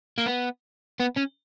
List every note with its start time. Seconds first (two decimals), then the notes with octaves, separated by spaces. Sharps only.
0.18 A#3
0.26 B3
1.00 B3
1.17 C#4